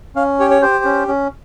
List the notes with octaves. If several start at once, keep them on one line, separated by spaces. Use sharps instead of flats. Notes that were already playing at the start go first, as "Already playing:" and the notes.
C#4 F5
G4 C#5
C#5
G4 C5
C#4
C#4